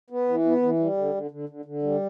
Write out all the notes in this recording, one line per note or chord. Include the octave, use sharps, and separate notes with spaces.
B3
E3
B3
E3
G3
D3
D3
D3
D3
D3
G3